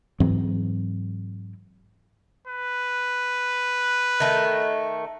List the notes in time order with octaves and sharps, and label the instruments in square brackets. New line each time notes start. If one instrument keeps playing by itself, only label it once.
[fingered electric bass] G#2 E3 F#3 C4
[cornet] B4
[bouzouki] D#3 A3